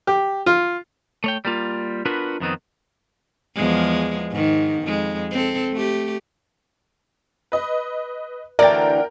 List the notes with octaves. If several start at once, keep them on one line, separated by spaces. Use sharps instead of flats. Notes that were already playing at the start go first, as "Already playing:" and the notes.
G4
F4
A3 C#5 G5
G3 A#3 F4
B3 D4 F4 F#4 A#4 B4
F2 D#3 B3 C4
E2 F3 G#3
G#2 D#3
F2 G#3
C4 A4
A3 G4
B4 D#5
D2 D3 E3 A#4 D5 G5 A6